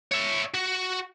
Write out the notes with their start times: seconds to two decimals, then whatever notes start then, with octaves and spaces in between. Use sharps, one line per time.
0.11 C#5 E5
0.54 F#4